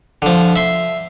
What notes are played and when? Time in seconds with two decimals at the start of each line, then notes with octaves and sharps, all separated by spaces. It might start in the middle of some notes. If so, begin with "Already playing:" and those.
0.22 D3 F3
0.56 E5 C6